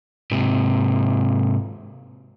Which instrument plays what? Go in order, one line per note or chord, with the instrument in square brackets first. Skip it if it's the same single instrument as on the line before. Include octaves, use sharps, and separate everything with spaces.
[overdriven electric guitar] G#2 C3